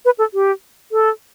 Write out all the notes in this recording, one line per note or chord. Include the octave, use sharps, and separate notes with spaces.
B4
A4
G4
A4